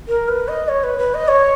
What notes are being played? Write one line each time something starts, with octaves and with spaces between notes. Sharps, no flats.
A#4
B4
D#5
C#5
B4
B4
D#5
C#5